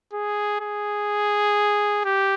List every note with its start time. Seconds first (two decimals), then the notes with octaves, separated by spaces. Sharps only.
0.13 G#4
0.61 G#4
2.05 G4